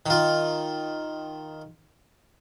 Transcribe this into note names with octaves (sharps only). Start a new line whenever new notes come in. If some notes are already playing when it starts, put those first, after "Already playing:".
D#3 F4